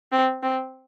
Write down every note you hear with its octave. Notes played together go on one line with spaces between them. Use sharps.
C4
C4